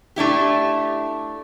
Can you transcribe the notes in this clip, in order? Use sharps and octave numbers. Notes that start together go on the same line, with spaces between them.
A3 D4 E4 G4